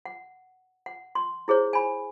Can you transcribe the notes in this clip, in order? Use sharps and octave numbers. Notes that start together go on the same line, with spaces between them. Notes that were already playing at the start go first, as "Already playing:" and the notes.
F#5
F#5
C6
E4 G#4 C5 C#5
G#5 B5